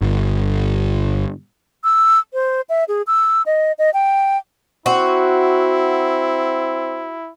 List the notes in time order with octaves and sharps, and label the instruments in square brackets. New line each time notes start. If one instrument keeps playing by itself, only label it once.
[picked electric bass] G1
[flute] E6
C5
E5
G#4
E6
D#5
D#5
G5
[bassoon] C4 [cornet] E4 [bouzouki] F#4